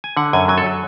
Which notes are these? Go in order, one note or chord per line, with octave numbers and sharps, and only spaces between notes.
G#5
D3 F#5
F#2 G#5
F#3 G#5
A4